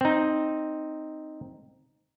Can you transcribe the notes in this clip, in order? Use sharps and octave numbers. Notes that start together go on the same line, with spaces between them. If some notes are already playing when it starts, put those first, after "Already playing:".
C4 D#4